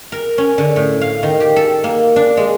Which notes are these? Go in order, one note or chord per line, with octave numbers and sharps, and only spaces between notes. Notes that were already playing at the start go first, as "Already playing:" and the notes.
A#4
C#4
D3
A2
F5
D#3
G4
A4
A#3
D4
G#3